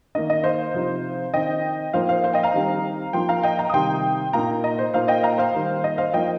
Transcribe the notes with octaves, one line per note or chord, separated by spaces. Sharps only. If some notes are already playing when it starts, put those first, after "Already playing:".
D#3 A#3 D#4 D#5
D#5
C5 F5
C3 F3 C4 D#4
D#3 C4 D#4 D#5 G5
F3 A#3 D#4 C5 F5
C5 F5
C5 F5
D#5 G5
F5 A#5
D#3 G3 C4 D#4
F3 A#3 D#4 G5 C6
F5 A#5
D#5 G5
F5 A#5
D#6
C3 D#3 G3 D#4 G5 C6
A#2 A#3 D#4 F5 A#5
D#5
C5
A#2 A#3 D#4 C5 F5
D#5 G5
F5 A#5
C5 F5
D#3 G3 A#3
D#5
C5 F5
F3 A#3 D#4 D#5 G5